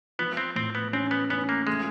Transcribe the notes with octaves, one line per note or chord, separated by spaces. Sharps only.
F3 B3
C4
A2 C4
B3
C4 C#4
B3
B3 C#4
A#3
G#3 A3